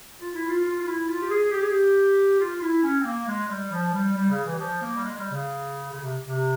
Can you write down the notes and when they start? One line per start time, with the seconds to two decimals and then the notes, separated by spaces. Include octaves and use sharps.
0.20 F4
0.34 E4
0.48 F4
0.64 F4
0.79 F4
0.86 E4
1.07 F4
1.22 G4
1.29 G#4
1.51 G4
1.61 G#4
1.70 G4
2.39 F4
2.61 E4
2.83 C#4
3.01 C4
3.05 A#3
3.27 G#3
3.48 G3
3.71 F3
3.92 G3
4.15 G3
4.29 C#3
4.44 E3
4.54 G3
4.58 F3
4.81 A#3
4.95 G3
5.03 G#3
5.17 G3
5.32 C#3
5.91 C#3
6.02 C3
6.27 C3